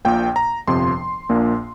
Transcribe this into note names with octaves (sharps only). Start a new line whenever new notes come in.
A#1 A#2 A#3 G5
A#5
G1 F2 C3 F3 C6
A#1 A#2 A#3 D4